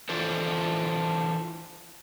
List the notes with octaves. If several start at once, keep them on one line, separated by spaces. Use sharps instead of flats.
E3 D4 F4 A4 C5